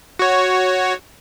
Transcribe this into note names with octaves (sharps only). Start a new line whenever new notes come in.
F#4 C#5